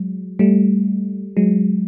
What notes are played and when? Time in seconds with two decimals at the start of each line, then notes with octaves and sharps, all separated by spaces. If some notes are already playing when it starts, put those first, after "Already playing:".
Already playing: F#3 G#3
0.39 G3 A3
1.37 F#3 G#3